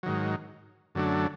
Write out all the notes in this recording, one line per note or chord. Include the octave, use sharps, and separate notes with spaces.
G#2 D#3 F#3
F#2 D3 F#3 A3 D4